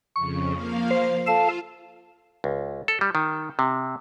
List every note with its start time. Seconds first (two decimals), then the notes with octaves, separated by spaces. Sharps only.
0.16 F2 C#3 C#6
0.53 F3 A#3 F5
0.91 C5
1.27 F4 A4 F5 A5 E7
2.44 C#2
2.88 A4
3.01 G3
3.15 D#3
3.59 C3